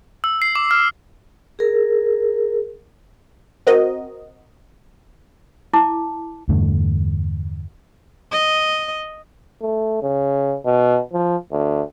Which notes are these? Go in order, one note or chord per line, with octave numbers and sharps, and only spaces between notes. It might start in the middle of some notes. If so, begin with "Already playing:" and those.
E6
C7
D6
F6
G#4 A#4
C4 F#4 A#4 D#5
E4 A5 D6
E2 G2 D3 A3
D#5
A3
C#3
B2
F3
D2